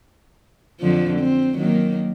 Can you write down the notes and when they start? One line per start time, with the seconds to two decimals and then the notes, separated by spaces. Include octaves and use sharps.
0.81 F2 D3 F3
1.19 C4
1.56 D#3 F#3 A#3